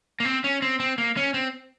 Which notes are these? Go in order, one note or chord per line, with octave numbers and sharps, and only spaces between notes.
A#3
C4
C#4
C4
C4
A#3
C#4
C4